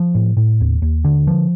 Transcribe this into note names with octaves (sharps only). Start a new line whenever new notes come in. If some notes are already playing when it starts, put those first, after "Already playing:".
Already playing: F3
A2
A2
D#2
D#2
D3
F3